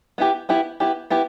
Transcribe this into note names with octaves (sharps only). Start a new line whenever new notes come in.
B3 E4 G4
B3 E4 G4
B3 E4 G4
B3 E4 G4